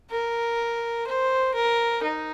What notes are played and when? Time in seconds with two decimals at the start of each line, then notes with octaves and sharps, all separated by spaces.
0.10 A#4
1.07 C5
1.54 A#4
2.02 D#4